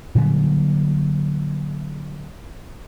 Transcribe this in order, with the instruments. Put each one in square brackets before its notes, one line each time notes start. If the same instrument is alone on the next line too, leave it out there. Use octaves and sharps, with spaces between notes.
[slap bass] A#2 D3 F#3 G3